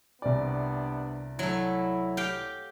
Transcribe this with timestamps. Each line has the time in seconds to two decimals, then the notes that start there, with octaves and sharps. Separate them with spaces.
0.22 C2 C3 B3 D4 D5
1.39 F#3 A3 E4
2.17 G4 F5 G5